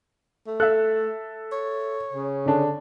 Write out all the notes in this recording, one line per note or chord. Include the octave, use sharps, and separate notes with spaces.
A3
A4 E5 F#6
C#5
C#3
D3 D4